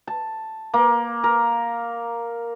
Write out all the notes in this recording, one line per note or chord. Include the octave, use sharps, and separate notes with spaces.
A5
A#3
A#4